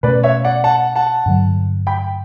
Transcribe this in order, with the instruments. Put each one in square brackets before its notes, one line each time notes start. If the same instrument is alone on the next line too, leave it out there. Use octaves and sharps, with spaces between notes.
[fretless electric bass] B2 A3 C#4 [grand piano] B4 D5
[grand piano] C#5 E5
D5 F#5
F#5 A5
F#5 A5
[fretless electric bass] G2 D3 F#3
[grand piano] G5 B5